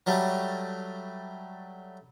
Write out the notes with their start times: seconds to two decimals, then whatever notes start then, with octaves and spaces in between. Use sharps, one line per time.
0.06 F#3 G3 A3